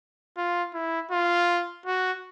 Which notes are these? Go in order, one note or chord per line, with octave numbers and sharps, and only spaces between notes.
F4
E4
F4
F#4